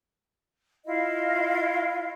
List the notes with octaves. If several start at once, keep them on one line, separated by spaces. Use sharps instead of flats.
E4 F4 D#5 F5